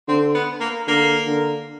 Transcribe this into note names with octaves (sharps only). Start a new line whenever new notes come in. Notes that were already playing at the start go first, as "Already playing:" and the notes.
D3 C4
B3
A#3
D3 A#3
D3